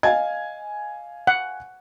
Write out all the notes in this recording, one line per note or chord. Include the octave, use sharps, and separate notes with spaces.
D#5 F5 G#5 G#6
F#5